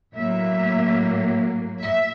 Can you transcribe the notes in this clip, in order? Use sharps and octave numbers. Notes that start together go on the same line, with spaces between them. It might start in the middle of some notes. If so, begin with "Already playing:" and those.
A2 F#3 A#3 E5
E5